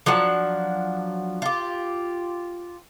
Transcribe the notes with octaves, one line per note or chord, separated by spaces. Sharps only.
F3 F#3 D4 F#5
F4 G4